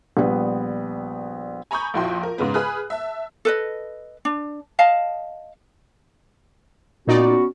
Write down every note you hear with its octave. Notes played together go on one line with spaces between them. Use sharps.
A#1 G3 B3 B4 F#5
G#5 A#5 B5 C#6 D#6 G6
A#1 F2 E4 F#4 G5 C6
A#4
G#2 C#3 G#3 B3
G#4 B4 B5 D#6 F6 F#6
E5 A5
A4 B4 D#5
D4
D#5 F5 A5
A#2 B3 C#4 D#4 F#4 D5